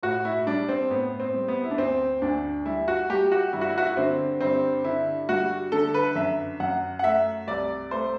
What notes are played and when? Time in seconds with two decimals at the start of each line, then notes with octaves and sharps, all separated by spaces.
0.03 A2 F#4
0.25 E4
0.39 E4
0.46 G3 D4
0.69 C4
0.90 A2 B3
1.20 C4
1.34 G3
1.48 B3
1.64 E4
1.71 D4
1.78 D2 C4
2.22 D2 D4
2.66 G3 E4
2.88 F#4
3.10 G3 G4
3.32 F#4
3.53 G2 E4
3.61 F#4
3.69 E4
3.78 F#4
3.85 E4
3.97 D3 C4
4.41 G2 C4
4.84 D3 E4
5.29 G3 F#4
5.72 D3 A4
5.94 B4
6.16 F#2 E5
6.60 F#2 F#5
6.99 F#5
7.03 A3 E5
7.47 C2 D5
7.91 A3 C5